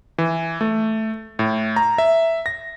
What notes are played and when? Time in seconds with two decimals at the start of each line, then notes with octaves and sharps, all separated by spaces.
0.18 E3
0.61 A3
1.39 A2
1.76 A#5
1.98 E5
2.46 A#6